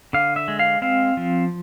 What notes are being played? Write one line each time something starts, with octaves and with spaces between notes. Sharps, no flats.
D3 F5
E5
G#3
F5
C4 F5
F3